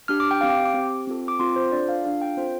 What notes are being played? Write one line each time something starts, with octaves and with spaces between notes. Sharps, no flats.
D4 G4 F6
D6
G5
C4 G4 F5
G5
D6
C4 G4
C4 F4 A4
D6
C4 F4 A4 C6
C5
D4 F4 A4 D5
F5
D4 F4 A4 F5
G5
C4 F4 A4 C5